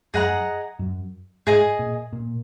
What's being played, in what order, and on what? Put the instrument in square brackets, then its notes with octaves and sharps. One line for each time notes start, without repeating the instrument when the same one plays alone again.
[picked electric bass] F#2 [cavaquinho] G#4 D#5 F#5 A#5
[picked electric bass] F#2
[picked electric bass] G#2 [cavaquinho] G#4 D#5 G#5
[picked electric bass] A#2
A#2